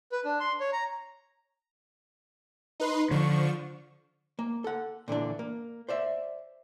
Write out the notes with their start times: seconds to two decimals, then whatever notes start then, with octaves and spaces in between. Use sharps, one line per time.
0.12 B4
0.25 D4
0.40 C6
0.60 C#5
0.73 A#5
2.80 D#4 B4 C6
3.11 D3 F3 C#6
4.39 A#3
4.64 A4 F#5
5.08 A#2 D3 E3 D4
5.39 A#3
5.89 C5 D5 E5